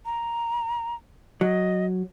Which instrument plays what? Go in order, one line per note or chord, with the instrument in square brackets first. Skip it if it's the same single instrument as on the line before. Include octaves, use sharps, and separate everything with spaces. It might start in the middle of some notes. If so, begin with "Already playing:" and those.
[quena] A#5
[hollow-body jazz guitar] F#3 [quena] D#5